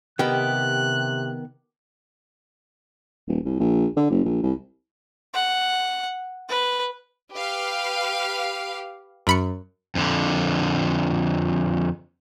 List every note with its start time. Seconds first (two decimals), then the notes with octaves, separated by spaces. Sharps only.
0.19 C3 D#3 B3 G4 F#6
3.28 D#1
3.45 C2
3.60 A#1
3.96 D3
4.10 F#1
4.25 A#1
4.43 C2
5.34 F#5
6.49 B4
7.32 G4 B4 F5
9.27 F#2 B5 C#7
9.95 F2 D3